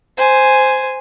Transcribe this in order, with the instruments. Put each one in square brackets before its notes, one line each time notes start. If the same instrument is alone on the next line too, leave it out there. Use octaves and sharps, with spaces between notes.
[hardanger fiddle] C5 G#5